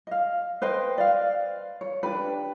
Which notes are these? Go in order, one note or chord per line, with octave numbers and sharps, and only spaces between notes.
D#5 F5
B4 C5 D#5 G5
D5 F5
C#5
D4 G4 B4